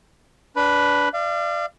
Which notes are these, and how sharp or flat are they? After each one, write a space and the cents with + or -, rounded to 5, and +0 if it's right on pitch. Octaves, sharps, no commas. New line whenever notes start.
D4 -20 B4 +0 B5 +0
D5 +25 F5 -35